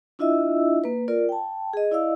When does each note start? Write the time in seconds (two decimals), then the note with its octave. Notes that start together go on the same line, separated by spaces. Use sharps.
0.19 D4 E4 F4 D#5 E5 E6
0.84 A#3 B4
1.08 F4 A#4 D5
1.29 G5 A5
1.73 G#4 D#5
1.92 E4 D5 D#5 F5 E6